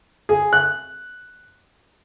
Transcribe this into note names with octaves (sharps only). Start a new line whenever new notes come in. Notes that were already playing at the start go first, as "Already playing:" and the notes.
G#4
F#6